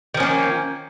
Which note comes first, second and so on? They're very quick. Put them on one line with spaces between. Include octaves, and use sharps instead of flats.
D#3 F3 C#4 A#3